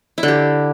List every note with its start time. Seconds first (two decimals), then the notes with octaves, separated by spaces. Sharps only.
0.18 E4
0.23 D3
0.28 G4